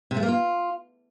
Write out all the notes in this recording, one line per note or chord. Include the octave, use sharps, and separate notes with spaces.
C3
A3
A#3
F4